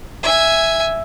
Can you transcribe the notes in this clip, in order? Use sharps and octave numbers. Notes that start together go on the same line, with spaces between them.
E5 G#5